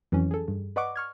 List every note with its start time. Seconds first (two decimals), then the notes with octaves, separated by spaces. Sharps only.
0.12 F2 E3 F#3 C#4
0.31 G#4 A4
0.48 G2
0.76 B4 D5 D#5 F#5 C#6 D6
0.96 C#6 F6 G#6